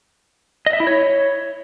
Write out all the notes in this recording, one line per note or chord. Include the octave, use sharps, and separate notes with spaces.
D#5
E5
E4
C#5